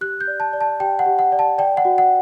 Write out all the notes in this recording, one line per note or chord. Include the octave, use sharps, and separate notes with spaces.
G4 F#6
G6
D5
A5
D5
A5
G4 G5
F#5
G4
F#5
D5
A5
D5 G5
F#5
F#4
F#5